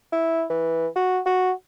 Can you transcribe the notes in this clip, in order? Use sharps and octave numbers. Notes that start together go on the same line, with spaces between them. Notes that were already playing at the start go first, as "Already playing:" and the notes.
E4
E3
F#4
F#4